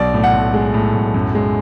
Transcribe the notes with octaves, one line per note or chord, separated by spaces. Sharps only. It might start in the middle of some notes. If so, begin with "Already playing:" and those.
Already playing: B1 D5
A2
F#5
B1
G#3
A2
B1
F#2
G#3